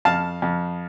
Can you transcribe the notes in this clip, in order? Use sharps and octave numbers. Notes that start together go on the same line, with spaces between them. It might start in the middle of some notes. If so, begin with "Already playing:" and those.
F2 F5 A5
F2